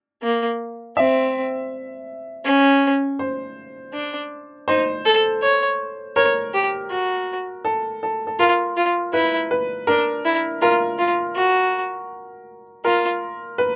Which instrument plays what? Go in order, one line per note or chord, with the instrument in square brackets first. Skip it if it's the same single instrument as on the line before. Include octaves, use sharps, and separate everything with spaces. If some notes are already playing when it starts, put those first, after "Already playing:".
[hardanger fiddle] A#3
[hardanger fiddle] C4 [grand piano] E5
[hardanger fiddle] C#4
[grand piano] C5
[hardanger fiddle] D4
[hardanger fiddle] D#4 [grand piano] C5
[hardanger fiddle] A4
C#5
[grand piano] A#4 [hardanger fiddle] C#5
[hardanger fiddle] G4
F#4
[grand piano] A4
A4
A4
[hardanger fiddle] F4 [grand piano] A#4
[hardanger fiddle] F4
[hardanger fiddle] E4 [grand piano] B4
[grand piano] B4
[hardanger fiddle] D4 [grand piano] A#4
[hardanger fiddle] E4
[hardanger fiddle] F4 [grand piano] A#4
[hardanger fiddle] F4
F#4
[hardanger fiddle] F4 [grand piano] A#4
[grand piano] B4